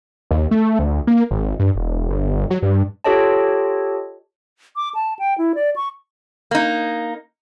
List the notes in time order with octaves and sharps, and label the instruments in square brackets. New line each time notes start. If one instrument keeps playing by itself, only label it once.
[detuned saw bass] D#2
A3
D2
A#3
G#1
G2
E1
G1
F#3
G2
[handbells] F4 G4 A4 C#5 D#5 A5
[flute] D6
A5
G5
E4
D5
C#6
[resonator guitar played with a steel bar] A#3 D#4